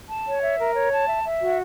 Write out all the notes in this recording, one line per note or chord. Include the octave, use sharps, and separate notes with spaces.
A5
C#5
E5
A#4
C#5
A5
E5
E5
F#4